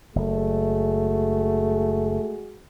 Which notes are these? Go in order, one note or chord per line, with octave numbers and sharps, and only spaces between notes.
F#1 G#3 A3 F#4 G#4